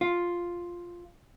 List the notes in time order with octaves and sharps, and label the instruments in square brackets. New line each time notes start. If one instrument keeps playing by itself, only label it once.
[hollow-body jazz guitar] F4